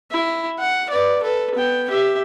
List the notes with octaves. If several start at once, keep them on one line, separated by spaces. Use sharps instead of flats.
E4
F#5
B4 D5
A4 B4
B3 G5
G4 E5